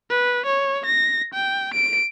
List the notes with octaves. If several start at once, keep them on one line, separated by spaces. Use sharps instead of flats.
B4
C#5
A#6
G5
D7